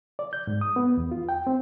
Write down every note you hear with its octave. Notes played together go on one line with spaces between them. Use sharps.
D5
G6
G#2
D#6
B3
E2
F4
G5
C4